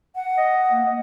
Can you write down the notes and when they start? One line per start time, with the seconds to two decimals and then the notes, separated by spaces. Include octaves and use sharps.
0.15 F#5
0.37 D#5
0.72 A#3
0.86 D#5